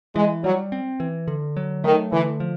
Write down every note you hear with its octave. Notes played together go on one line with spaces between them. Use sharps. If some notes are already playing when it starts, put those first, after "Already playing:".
E3 G#3
F#3 G3
C4
E3
D3
F#3
D#3 A3
D3 E3
F3